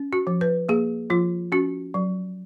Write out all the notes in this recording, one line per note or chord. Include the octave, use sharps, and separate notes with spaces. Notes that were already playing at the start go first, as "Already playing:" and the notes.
Already playing: C#4
F#4
F3
B4
A#3 G#4
F3 F4
C#4 F#4
F#3